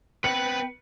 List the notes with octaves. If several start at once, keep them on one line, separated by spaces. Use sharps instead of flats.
B3 C4 B4 G5 B5 C#7